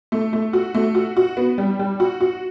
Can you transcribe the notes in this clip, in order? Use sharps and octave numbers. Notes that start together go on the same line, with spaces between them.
A3
A3
F#4
A3
F#4
F#4
B3
G3
G3
F#4
F#4